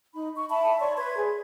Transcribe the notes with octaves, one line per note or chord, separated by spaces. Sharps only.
D#4 B5
C#6
E5 A5 B5
C#5 D5 C6 C#6
B4 C6 G#6
G#4